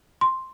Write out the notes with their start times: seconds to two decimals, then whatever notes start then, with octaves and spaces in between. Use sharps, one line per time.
0.21 C6